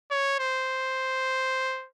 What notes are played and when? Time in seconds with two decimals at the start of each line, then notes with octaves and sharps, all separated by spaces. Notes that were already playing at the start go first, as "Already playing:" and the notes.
0.11 C#5
0.39 C5